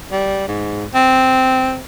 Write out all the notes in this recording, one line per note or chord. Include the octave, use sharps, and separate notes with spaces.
G3
G#2
C4